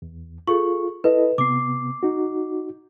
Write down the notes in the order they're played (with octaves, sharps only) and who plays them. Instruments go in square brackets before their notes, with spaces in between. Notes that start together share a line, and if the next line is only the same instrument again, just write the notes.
[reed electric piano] E2
[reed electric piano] F4 [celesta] G#4 A4 C#6
[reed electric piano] E4 A4 D#5 [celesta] B4
[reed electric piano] C3 B3 [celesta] D6 C7
[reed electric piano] D#4 F#4